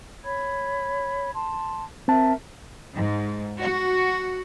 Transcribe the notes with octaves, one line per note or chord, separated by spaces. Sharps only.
C#5 B5 G#6
A5 C6
C4 A#4 E5 A5
G#2
F#4